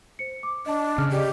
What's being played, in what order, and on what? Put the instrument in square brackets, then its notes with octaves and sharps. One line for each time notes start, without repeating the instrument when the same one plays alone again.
[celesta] C5 C#7
D6
[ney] D4 [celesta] D#5 A5
[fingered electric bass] C#3 [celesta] F6
[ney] G4 [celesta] G#4 D5 D#5